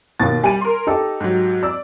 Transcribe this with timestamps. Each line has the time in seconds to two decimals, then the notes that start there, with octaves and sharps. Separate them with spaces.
0.20 D#2 B2 A6
0.44 G3 G#5 D#7
0.61 A#4 C6
0.87 D#4 G4 A4 D#5
1.20 G#2 F#3
1.63 D5 E6